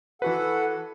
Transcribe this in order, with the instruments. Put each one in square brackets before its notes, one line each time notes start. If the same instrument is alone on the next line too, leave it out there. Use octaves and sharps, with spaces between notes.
[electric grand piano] E3 F#4 B4 [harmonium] A4 F#5